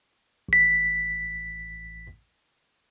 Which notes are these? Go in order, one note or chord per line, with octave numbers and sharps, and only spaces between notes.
A1 B6